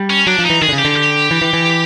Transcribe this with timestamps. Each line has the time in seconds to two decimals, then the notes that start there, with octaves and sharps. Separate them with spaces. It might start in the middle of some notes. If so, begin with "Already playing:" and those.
Already playing: G3
0.10 C#4
0.27 F#3 D4
0.39 F3
0.45 E3 D#4
0.62 D#3 G#4
0.69 D3
0.73 C#3
0.78 G4
0.85 D3
0.96 G4
1.31 E3
1.42 E3
1.53 E3